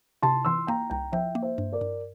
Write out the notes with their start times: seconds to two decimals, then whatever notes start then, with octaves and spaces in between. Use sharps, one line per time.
0.22 C3 A5 C6
0.45 E3 C6 E6
0.67 A#3 G5 A#5
0.90 C2 G5 A#5
1.12 F3 E5 G5
1.35 A#3
1.42 C5 E5
1.58 G2
1.72 A#4 D5
1.81 G2